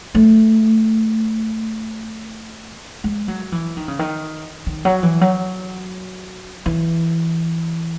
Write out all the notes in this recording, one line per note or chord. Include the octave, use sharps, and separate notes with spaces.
A3
G#3
F#3
E3
D#3
C#3
D#3
D#3
F#3
E3
F#3
E3